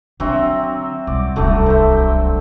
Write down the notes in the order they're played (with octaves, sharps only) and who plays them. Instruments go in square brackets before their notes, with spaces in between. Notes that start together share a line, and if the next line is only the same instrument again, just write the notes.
[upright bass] D3 [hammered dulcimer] F#3 C4 E5
[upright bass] C2 [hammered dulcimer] D5
[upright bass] D1 C2 [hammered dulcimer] D3 F#3 A3
[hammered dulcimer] C5 E5